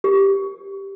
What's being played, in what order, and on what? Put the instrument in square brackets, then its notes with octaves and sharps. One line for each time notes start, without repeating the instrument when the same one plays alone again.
[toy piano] G4